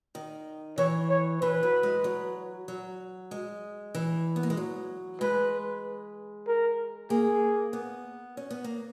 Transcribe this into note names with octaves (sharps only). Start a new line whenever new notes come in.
D#3
E3 C#5
C#5
E3 B4
F#3
G#3
F#3
F#3
G#3
E3
B3
A#3
G#3
F#3
G#3 B4
A#4
A#3 G#4
B3
C#4
B3
A#3